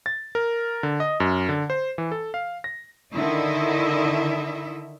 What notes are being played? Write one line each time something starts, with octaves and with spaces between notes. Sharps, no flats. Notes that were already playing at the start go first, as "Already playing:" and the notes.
A6
A#4
D3
D#5
F#2
D3
C5
E3
A4
F5
A#6
D3 D#3 E4 D#5 E5